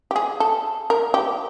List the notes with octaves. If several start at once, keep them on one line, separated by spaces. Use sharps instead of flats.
G4
G#4
A4
A#4
G4